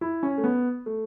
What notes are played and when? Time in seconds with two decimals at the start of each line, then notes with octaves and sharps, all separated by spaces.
0.01 E4
0.23 C#4
0.38 A3
0.44 B3
0.86 A3